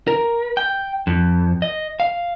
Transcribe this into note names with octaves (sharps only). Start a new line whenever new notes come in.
A#4
G5
F2
D#5
F5